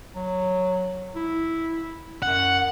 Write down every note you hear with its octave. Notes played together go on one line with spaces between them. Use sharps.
F#3
E4
F#2 F#5